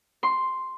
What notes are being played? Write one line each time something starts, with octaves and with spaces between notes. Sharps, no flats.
C6